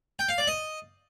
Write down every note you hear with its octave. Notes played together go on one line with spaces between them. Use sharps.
G5
F5
D5
D#5